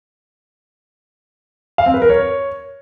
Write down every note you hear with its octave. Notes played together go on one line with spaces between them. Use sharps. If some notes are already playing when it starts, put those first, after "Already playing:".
F5
C4
B4
A#4
C#5